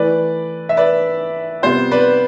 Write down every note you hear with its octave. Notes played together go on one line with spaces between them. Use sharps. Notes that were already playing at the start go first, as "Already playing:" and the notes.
Already playing: E3 A3 E4 B4 D5
E5
B4 D5
C3 G3 B3 F4 C5
B4 D5